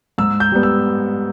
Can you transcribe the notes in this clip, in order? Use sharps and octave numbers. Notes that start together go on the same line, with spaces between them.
G#2 E6
G6
G3 B3
E6